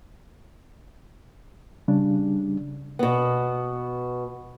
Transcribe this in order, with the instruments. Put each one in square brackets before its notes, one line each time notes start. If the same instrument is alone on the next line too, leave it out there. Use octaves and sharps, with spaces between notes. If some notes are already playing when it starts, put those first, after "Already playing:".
[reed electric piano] C#3 G3 D4
[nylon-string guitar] B2 B3